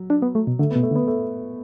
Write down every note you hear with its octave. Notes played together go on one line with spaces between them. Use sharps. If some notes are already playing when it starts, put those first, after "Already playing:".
Already playing: F#3
D4
B3
A3
B2
D3 A3
B2 B3
A3
D3
B3
A3